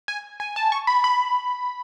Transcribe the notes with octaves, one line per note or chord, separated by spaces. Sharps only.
G#5
G#5
A5
C#6
B5
B5